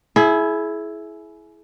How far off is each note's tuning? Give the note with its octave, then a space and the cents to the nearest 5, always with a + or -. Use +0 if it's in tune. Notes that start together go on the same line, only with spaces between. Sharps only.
E4 +0 G#4 +30